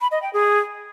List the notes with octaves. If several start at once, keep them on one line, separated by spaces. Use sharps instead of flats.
B5
D#5
G5
G#4